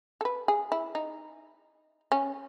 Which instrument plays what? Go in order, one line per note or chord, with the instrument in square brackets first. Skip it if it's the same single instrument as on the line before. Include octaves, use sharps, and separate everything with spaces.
[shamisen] A4
B4
G#4
E4
D#4
C#4